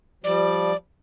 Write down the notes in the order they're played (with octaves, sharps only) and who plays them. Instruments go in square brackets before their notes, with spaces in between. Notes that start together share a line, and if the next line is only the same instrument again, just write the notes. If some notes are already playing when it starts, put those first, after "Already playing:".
[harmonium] F3 G3 [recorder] D5